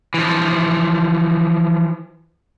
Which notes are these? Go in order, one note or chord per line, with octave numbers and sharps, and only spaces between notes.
E3 F3